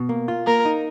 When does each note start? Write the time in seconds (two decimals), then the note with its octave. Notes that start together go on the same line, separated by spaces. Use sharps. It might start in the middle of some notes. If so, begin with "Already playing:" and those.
Already playing: B2
0.09 A#3
0.28 F4
0.47 A#3 A#4
0.65 D#4